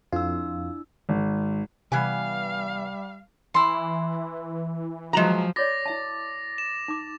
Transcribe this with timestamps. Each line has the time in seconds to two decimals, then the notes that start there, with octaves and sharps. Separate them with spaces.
0.12 F2 D4 E4 F4 E6
1.09 G#1
1.92 C3 E3 G3 B3 F5 G#5
3.54 E3 E4 C6
5.13 F3 F#3 G#3 A#5
5.56 F#4 C#5 D5 D6 A6 A#6
5.86 E4 E5 A5
6.58 E7
6.88 D#4 D6